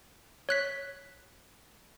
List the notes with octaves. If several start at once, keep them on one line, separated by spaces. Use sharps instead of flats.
C#5 F#6 B6